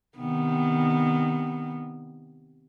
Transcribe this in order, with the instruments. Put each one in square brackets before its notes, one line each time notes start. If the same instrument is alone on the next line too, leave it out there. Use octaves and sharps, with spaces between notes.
[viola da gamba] C3 D#3 B3